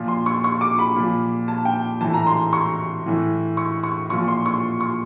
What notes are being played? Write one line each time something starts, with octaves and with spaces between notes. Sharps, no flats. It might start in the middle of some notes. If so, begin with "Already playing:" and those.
Already playing: A#2 F3
C6
C#6
C#6
D6
B5
A#2 F3
A5
G5
A2 E3 A5
A#5
C6
C#6
A2 E3
C#6
C#6
A#2 F3 C#6
C6
C#6
C#6